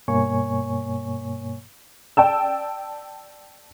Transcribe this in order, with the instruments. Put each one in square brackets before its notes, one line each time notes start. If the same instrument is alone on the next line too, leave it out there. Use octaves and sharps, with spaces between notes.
[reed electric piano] G2 B2 A#3 C#5 G#5 C#6
[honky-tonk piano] D5 G5 A5 E6